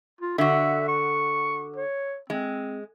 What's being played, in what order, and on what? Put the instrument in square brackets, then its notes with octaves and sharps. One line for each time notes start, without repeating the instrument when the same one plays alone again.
[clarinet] F4
[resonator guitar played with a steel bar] D3 F#4 [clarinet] E5
[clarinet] C#6
C#5
[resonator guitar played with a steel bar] G#3 [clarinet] C4